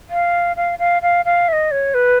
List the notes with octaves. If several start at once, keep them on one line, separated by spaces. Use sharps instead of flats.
F5
F5
F5
F5
F5
E5
D#5
C#5
B4